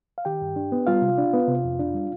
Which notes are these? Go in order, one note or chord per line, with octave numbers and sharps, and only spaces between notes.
F5
D#3 G4 G5
G2
D4
B3
G3 F4 F5
C3
D4
B3
C3
F2
D4
G3